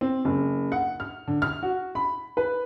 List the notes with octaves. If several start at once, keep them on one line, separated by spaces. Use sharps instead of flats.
C4
F#1
F#5
F6
D3
F6
F#4
B5
B4